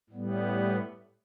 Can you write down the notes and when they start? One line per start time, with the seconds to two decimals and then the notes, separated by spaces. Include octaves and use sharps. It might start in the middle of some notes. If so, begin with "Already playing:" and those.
0.10 A2 G3 B3